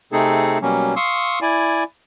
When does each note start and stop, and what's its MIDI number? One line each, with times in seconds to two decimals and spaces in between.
0.12 0.58 48
0.12 0.58 57
0.12 0.58 60
0.12 0.58 63
0.12 0.58 68
0.12 0.58 69
0.62 0.95 47
0.62 0.95 54
0.62 0.95 55
0.62 0.95 58
0.62 0.95 61
0.96 1.39 77
0.96 1.39 84
0.96 1.39 85
0.96 1.39 87
0.96 1.39 88
1.42 1.84 64
1.42 1.84 74
1.42 1.84 80